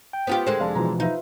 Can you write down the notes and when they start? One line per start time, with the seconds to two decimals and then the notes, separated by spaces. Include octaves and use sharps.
0.13 G5
0.27 B3 F4 G4 C5
0.47 D3 G#3 A4 A#4 C5
0.60 F1 D5 F5 A5
0.75 B2 E3 F3 A#5
1.00 D#4 F4 B4 E5